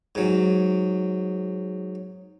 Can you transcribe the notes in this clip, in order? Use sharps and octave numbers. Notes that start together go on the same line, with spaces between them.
G#2 F#3